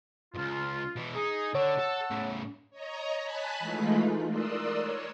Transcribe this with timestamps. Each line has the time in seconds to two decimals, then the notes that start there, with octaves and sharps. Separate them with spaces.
0.34 C#2 G#2 F4
0.96 B2 E3
1.15 D#4 G#4
1.55 D3 C#5 F#5 A5 E6
1.79 A4
2.11 A2 C#3
2.71 C#5 D#5 A#5
3.21 G#5 A5 B5 F#6 B6
3.59 E3 G#3 A3 D#4 F4
4.28 A#4 D5 C6 D#6 E6 F#6
4.74 C#5